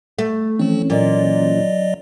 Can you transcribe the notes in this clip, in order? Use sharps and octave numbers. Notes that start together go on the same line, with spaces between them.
A3
E3 F3 C4 C#4
A#2 F#3 D5 D#5